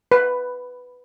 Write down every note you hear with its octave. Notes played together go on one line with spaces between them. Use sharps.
B4